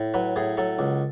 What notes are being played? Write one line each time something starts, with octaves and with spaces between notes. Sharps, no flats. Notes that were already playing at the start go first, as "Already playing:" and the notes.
Already playing: A2
F#3 B4
A2 G#4
F#3 A4
C#2